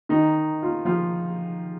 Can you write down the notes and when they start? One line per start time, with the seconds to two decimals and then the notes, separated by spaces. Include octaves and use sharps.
0.09 D#3 D#4
0.63 F4
0.85 F3 F4